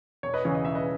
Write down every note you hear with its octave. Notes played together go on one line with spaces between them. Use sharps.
E1 C#5
B4 D#5
E2 C#3 E3 C#5
D#5
E1 E5
B4 D#5